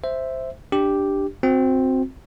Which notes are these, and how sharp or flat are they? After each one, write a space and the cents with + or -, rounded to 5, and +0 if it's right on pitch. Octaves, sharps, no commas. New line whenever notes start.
C5 +0 E5 +0
D4 +0 G4 +0
C4 +0 F#4 -25